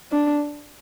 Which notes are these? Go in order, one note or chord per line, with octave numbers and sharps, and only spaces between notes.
D4